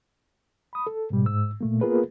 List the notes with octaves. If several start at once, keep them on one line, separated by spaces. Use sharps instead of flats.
B5 D#6
A4
G#2 B2 G3
G#2 E6
A#2 A3 A#3
A#3 B3 F4 G#4 A#4 B4